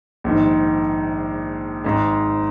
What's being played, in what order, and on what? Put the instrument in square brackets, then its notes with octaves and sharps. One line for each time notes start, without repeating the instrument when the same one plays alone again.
[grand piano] A#1 G#2 D#3
G#1 G#2 G#3